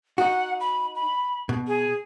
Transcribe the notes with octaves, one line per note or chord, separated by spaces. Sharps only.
D#4 F#4 F#5
B5
B5
B2
G#4